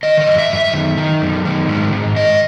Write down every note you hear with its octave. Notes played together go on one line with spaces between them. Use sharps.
D#3 D#5
D#5
F#2
E5
F#2
E5
D#3
D#3
F#2
D#3
G#2
G#2
D#3 D#5